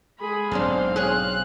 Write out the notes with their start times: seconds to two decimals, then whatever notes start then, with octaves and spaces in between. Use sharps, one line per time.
0.19 G#3 G#4 B5
0.51 B1 G#2 D3 C4 D4 C5 F5
0.96 C#4 G#4 F#6